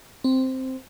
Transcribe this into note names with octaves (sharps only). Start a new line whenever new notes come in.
C4